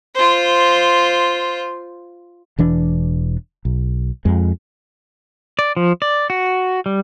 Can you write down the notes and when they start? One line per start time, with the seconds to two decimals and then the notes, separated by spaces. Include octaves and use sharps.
0.15 F4 C5
2.58 E1 E3 D4
3.65 B1
4.25 F2 G#3
5.59 D5
5.77 F3
6.02 D5
6.30 F#4
6.86 G3